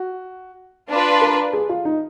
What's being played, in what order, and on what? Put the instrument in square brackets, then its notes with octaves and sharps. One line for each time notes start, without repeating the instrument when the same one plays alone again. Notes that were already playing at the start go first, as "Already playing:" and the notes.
Already playing: [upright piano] F#4
[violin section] D4 F4 B4
[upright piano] A#4
G#4
F4
D#4